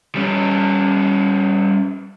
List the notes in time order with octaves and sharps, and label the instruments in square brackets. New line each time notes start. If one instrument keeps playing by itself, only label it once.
[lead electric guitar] G3 C#4